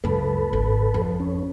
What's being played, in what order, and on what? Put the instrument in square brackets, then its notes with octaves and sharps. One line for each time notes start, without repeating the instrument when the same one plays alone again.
[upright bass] C#2 F#2 [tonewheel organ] A4 B4
[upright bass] G#1
F2
[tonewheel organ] C#4